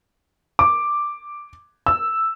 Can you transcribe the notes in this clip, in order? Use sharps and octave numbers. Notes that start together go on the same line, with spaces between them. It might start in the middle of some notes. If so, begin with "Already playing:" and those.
D6
E6